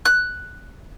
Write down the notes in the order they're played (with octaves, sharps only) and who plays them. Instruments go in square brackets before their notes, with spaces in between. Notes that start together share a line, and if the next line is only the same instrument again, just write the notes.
[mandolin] F#6